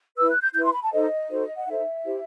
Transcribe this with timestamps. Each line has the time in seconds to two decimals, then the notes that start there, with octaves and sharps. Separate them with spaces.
0.17 E4 B4 E6
0.30 F#6
0.41 G6
0.54 E4 B4 G6
0.64 C6
0.73 B5
0.82 A5
0.92 D#4 A4 C5 D#5
1.29 D#4 F#4 A4 C5
1.57 F#5
1.67 D#4 A4 C5 E5
2.05 E4 G4 C5